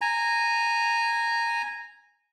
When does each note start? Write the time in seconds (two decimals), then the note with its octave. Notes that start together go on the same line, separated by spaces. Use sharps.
0.01 G#5 A#5